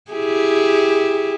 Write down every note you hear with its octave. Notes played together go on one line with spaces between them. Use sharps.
E4 G4 G#4